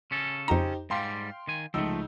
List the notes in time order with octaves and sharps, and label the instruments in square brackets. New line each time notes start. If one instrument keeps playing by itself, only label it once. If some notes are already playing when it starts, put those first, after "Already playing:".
[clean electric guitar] C#3 C#4 A4
[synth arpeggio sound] F2 A#5 [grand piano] D#4 G4 C5
[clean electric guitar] G#2 G3 [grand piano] F5 G5 C6
[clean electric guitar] D#3 G#5
[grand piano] C#2 D#4 E6 [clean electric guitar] F3 A3